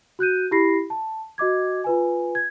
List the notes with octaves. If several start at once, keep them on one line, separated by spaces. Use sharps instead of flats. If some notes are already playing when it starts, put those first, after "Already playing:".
F#4 F#6 G6 D#7
E4 G4 B5 A#6 C7
A5
F#4 D#5 D6 G#6
F4 B4 G#5
G#6